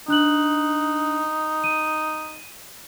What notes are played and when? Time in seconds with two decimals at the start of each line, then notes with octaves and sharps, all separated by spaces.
0.08 D4 D#4 F#6 F#7
1.64 D#7